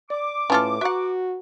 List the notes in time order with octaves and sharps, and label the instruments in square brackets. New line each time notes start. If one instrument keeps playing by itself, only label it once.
[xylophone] D5 [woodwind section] D6
[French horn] A2 [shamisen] C#4 F4 A4 [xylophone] B4 E5 A5
[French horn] F#4 [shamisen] E5 F#5 [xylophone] A#5 C#6 F#6